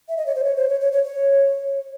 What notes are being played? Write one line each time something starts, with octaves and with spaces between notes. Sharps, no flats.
E5
D#5
C#5
C5
C#5
C5
C#5
C#5
C#5
C#5